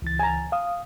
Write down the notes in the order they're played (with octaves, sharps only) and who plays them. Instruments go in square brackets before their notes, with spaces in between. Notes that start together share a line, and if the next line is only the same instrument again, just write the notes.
[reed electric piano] C#2 E3 A6
[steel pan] G#5 A#5
[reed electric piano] F5 D#6